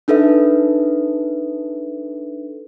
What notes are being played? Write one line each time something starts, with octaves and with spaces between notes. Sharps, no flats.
D4 D#4 A4 B4 E5